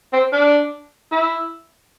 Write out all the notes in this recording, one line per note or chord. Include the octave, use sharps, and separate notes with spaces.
C4
D4
E4